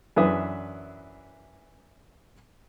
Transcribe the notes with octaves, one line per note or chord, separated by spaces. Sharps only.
F#2 E3 D4 B4 E5 D#6